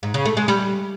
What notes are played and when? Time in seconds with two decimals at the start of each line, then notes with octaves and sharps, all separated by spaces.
0.03 G#2
0.14 C#3
0.25 A3
0.37 G#3
0.48 G3